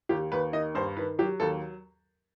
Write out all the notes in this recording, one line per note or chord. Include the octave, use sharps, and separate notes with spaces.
D#2 G4
D#2 B4
D#3 D#5
G2 C5
D#3 B4
F#3 G4
D#2 A4